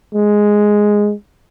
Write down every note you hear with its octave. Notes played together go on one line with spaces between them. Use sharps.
G#3